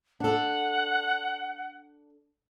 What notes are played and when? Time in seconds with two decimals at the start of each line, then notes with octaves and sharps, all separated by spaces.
0.20 D4 A4 F#5